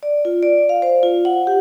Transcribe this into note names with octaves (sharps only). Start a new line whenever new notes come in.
D5
F4
D5
F5
C5
F4
F#5
G4